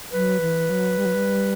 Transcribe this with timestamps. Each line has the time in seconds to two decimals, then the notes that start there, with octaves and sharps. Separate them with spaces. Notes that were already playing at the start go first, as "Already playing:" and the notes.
0.13 F#3 B4
0.41 E3
0.70 F#3
0.98 G3
1.05 F#3
1.14 G3